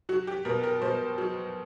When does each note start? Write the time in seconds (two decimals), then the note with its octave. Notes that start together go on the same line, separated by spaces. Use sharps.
0.09 F#3 F#4
0.27 G4
0.45 B2 A#4
0.64 A#4
0.82 B2 C5
1.18 F#3